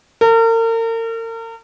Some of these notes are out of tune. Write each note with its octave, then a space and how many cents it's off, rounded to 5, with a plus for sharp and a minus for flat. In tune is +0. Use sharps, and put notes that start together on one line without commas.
A#4 -40